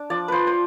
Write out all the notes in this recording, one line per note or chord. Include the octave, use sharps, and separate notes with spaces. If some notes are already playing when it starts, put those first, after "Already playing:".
Already playing: D4
F3 D5
F3 B4 C5
C5